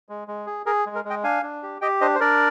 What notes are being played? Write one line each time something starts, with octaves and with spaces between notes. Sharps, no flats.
G#3
G#3
G#4
G#4 A#4
G#3
A#4
G#3 D#5 G5
D4 F5 G#5
D4
G4
G4 D#5 G5
D4 C5 D#5
C5
D4 A#4 D5